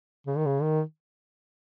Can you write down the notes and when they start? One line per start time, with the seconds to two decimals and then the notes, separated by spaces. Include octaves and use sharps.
0.27 C#3
0.37 D#3
0.46 C#3
0.62 D#3